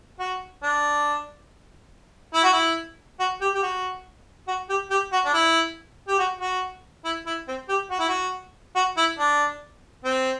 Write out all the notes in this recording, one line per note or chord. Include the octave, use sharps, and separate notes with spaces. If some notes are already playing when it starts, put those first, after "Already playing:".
F#4
D4
E4
F#4
E4
F#4
G4
G4
F#4
F#4
G4
G4
F#4
D4
E4
G4
F#4
F#4
E4
E4
C4
G4
F#4
E4
F#4
F#4
E4
D4
C4